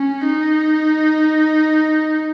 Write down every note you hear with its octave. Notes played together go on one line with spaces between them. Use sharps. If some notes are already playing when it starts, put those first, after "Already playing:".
Already playing: C#4
D#4